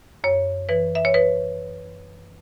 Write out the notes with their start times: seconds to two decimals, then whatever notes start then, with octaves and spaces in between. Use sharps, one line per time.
0.24 F#2 C#5
0.69 E3 B4
0.95 E5
1.05 C#5
1.14 B4